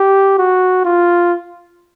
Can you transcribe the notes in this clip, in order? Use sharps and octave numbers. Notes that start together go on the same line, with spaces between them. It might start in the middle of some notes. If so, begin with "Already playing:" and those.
Already playing: G4
F#4
F4